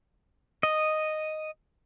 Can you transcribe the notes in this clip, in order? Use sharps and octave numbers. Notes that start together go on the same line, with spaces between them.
D#5